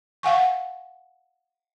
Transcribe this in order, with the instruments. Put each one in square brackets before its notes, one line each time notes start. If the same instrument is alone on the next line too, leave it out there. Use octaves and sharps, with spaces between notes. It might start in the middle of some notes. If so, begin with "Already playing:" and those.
[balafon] F5 F#5 G#5 C#6